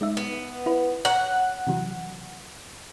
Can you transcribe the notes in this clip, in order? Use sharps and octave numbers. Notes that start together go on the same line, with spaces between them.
G#3 D#4 E5
B3
E4 B4
C#5 F#5 A#5
C3 E3 F#3